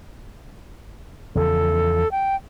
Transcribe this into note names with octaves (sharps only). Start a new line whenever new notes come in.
E2 C#3 F3 A4
G5